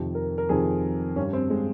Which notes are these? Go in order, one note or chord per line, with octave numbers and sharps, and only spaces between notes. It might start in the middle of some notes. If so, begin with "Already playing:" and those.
Already playing: F2 C3 D#3
A#4
A#4
F2 C3 D#3 G#4
G2 G3 C#4
C4
G#3